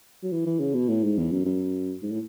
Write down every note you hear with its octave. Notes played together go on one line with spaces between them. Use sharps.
F#3
E3
E3
C#3
B2
A2
G#2
E2
F#2
F#2
G#2
A2